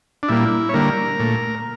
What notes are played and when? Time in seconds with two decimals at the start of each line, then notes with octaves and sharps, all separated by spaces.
0.23 D4
0.28 A#2 G3 A#3 E4
0.69 C#5
0.74 D3 G3 A#3 A#4
1.19 A#2 A3